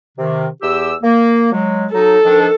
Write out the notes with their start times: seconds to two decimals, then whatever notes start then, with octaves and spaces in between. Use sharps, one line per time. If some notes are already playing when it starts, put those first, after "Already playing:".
0.18 C3 D#3
0.62 E2 G4 E6
1.03 A#3
1.52 F#3 G#3
1.93 F#3 D#4 A4
2.25 D#3 F3 D4